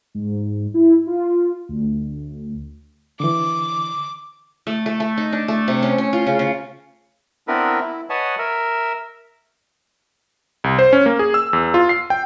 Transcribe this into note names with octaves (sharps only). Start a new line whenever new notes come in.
G#2
E4
F4
D2
D3 E3 D6
A3
A3
A3
D#4
D4
A3
C3
C#4
C#4
F4
C#3
C#3
B3 C4 D4 E4 A#4 B4
E4
B4 C#5 D#5 F#5 G#5 A5
A#4 E5
C2
C5
C#4
A#3
G#4
E6
E2
F4
C7
G5